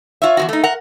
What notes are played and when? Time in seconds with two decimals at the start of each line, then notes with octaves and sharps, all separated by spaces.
0.22 F4 C#5 E5
0.37 E2 C3 F#4
0.49 A3 D#4
0.63 A#4 F#5